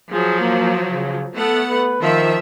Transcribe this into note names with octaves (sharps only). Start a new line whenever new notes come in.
F3 F#3 G#4
A#3
C#3
A3 B3 A4 F#5
B4
D#3 F3 E5